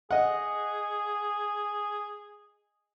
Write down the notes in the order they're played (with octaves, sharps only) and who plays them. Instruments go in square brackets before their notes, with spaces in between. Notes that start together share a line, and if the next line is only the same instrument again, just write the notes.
[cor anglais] G#4 [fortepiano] D#5 F#5